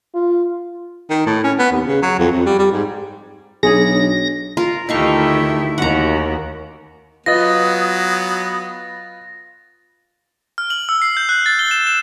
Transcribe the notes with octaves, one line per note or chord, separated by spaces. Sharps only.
F4
D#3
A2
C#4
B3
D#2
C#3
F#3
F2
F2
G3
G3
G#2
B1 D4 G#4 C#5 A#6
F4 A#4
D2 D#3 A3 D#4 E4 G4 F5 C#6
D#2 F#4 A#4 F#5 A#5
F#3 B3 F4 B4 D#5 D#6 A6 A#6
F6
F#7
E6
C7
G6
F#6
A6
G7
E7
E7